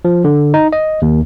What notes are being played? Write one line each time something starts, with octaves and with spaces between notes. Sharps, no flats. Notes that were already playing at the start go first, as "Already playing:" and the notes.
F3
D3
D#4
D#5
D#2